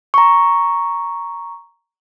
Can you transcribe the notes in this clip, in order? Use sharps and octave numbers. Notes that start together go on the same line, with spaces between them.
A#5 C#6